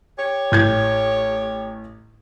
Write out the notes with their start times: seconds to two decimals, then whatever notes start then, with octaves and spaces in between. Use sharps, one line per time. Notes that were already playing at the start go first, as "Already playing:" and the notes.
0.18 G4 C#5
0.52 A1 G6 G#6